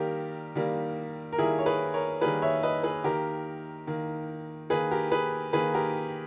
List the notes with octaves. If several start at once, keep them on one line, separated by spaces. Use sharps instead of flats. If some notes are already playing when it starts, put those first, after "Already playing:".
Already playing: D#3 G3 A#3 G4 A#4
D#3 G3 A#3
A#4
D#3 G3 A#3 E4 G#4
C#5
G#4 B4
A#4 C#5
D#3 G3 A#3 G#4 B4
C#5 E5
B4 D#5
G#4 B4
D#3 A#3 G4 A#4
D#3 A#3
D#3 A#3 G#4 B4
G4 A#4
G#4 B4
D#3 A#3 G#4 B4
G4 A#4